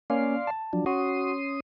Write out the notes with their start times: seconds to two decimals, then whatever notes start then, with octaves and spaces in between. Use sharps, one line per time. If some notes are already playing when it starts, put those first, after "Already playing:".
0.10 A#3 C#4 D5 F5 C6
0.47 A5
0.73 F3 F#3 D4
0.86 C#4 F#4 C6 D#6